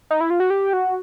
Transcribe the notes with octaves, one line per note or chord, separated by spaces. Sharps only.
D#4
E4
F4
F#4
G4
F#4